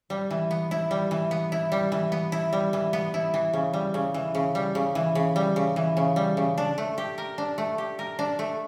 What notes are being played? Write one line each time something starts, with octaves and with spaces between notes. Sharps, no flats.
G3
E3
B3
E4
G3
E3
B3
E4
G3
E3
B3
E4
G3
E3
B3
E4
E3
C#3
G3
C#3
E3
C#3
G3
C#3
E3
C#3
G3
C#3
E3
C#3
G3
C#3
D4
A3
G4
A#4
D4
A3
G4
A#4
D4
A3